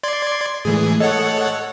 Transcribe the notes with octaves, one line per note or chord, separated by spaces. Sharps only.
D5 C6 G#6
A2 E3 G#3 A3 G#4
A4 C#5 D#5 F#5